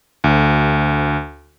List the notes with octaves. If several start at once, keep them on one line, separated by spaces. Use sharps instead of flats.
D2